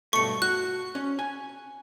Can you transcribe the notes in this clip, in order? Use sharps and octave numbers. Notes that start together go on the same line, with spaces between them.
G2 B2 A3 C#6 C#7
F#4 F#6
C#4
G#5